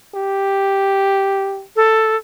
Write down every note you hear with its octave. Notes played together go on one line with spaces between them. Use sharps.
G4
A4